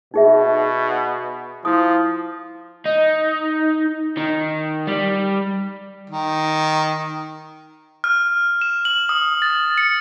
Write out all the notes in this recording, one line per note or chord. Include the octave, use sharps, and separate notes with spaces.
B2 D#4 G#4 E5
F3 E4 D#6
D#4
D#3
G3
D#3
F6
E7
F#7
D#6
A6
C#7